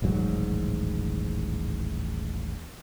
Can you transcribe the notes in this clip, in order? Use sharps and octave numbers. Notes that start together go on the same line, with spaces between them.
D#1 A1 G#2 F#3